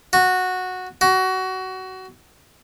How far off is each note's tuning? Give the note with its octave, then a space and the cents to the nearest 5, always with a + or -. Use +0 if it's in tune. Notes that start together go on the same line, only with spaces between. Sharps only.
F#4 -10
F#4 +20